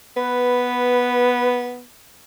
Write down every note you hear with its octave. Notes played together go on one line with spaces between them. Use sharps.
B3 B4